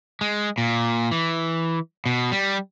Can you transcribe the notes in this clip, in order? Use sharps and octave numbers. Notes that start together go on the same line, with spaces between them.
G#3
A#2
E3
B2
G3